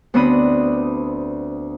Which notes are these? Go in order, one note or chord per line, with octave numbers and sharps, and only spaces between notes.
D2 B3 C4 D4 B5 D#6